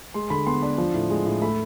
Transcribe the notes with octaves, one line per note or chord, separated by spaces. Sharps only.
G#3 C6
D3 B5
B3 C6
D4
F3
A2
G#3
A2
A3 B5